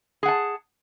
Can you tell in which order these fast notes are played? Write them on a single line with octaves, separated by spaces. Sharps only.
G#4 F#5 A5